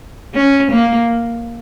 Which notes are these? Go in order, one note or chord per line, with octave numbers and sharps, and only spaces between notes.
C#4
A#3